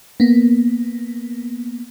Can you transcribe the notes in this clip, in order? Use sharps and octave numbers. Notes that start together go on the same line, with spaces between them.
A#3 B3